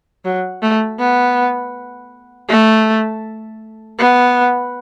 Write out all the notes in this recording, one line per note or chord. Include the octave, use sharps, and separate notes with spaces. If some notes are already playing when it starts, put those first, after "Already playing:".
F#3
A3
B3
A3
B3